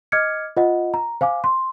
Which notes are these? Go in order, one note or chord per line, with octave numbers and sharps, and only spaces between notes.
D#5 D6 F6 G#6 C#7
F4 C5 D#5 F#5
A#5
C5 F5 G#5 D6
C6